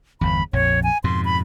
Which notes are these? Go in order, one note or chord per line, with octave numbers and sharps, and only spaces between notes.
G1 E2 B5
A#1 F2 C#5
G#5
F2 G#2 B2 C6
B5